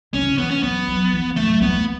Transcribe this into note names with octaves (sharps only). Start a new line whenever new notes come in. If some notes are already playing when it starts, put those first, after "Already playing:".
C#3 C#4
D3
C#3
E3 B3
C#4
F#3 B3
F#3
E3
E3
D3 A3
G3
F#3
G3 B3
A3